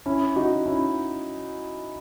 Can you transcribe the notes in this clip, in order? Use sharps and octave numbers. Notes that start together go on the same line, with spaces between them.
C#4 E4
D#4 F#4
C#4 E4